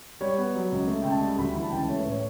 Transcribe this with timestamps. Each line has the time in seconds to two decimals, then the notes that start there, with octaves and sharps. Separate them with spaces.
0.21 G3 C#5
0.38 B3
0.54 F#3
0.72 C#2
0.88 A3
1.02 C#2 G5
1.10 A5
1.21 G3
1.38 D2 B5
1.55 E3 B5
1.62 A5
1.70 C#2 G5
1.77 A5
1.88 A3 C#5
1.99 B4
2.05 A2
2.10 C#5